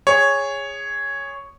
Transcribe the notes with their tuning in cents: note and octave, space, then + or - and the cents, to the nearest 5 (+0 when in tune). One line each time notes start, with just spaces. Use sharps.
G#4 -15 C#5 +0